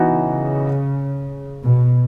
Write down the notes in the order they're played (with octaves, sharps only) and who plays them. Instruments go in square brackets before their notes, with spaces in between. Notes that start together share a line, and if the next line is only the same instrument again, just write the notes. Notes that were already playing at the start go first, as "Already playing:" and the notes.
Already playing: [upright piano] E3 B3 D#4 F#4
[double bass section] C#3
B2